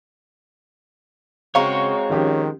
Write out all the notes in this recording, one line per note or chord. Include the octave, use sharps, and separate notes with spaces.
C#3 G#3 C4 F#4 C#5 F5 A#5 C#6
D#3 F3 C#4 G4